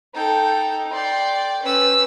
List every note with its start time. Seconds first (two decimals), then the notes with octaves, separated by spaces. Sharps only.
0.14 D#4 A4 G5
0.93 D5 G5 C6
1.62 C#4 B4 E6